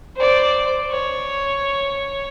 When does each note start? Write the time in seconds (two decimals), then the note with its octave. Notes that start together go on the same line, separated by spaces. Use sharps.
0.16 C5 D5
0.91 C#5